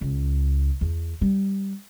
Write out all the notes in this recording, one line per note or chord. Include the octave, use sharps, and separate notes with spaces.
C#2
E2
G3